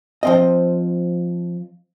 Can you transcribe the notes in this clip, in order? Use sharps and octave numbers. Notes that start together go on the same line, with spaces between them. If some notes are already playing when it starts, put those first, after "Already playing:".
F3 C4 D#5